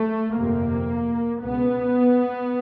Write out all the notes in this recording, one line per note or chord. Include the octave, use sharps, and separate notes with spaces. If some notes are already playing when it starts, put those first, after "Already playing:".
Already playing: A3
G1 F2 C3 A#3
C#2 B2 B3